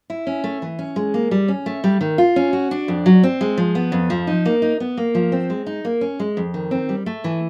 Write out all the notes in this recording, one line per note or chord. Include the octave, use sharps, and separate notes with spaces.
E4
C#4
A3
E3
C#4
G#3
A#3
G3
C#4
A3
G3
D#3
F4
C#4
F#4
D4
F2
F#3
C4
G#3
F3
B3
F2
F3
D#4
A#3
D#4
B3
A#3
F3
C4
G#3
D#4
A#3
C#4
G#3
F2
D#3
C4
G3
A3
E3